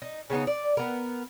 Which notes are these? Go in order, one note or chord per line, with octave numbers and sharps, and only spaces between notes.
D#4
C#3 A3 B3 D#4
D5
B3 A#4